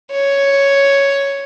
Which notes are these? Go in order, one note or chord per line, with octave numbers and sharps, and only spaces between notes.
C#5